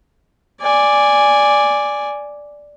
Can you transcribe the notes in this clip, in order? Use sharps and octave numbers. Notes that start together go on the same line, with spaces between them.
D5 G#5